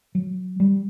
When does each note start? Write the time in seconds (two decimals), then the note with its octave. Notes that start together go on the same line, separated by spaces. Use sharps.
0.15 F#3
0.60 G3